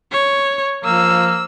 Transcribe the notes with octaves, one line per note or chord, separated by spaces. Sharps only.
C#5
F3 A#3 E6